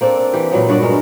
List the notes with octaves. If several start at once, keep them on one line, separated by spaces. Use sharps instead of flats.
A#3 C4 D4 A4
E3 G4
A#2 F#3 B3
G2 F#4 D5 E5
G#3 A#4